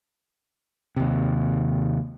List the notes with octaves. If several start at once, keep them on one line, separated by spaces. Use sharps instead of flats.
D#2 C3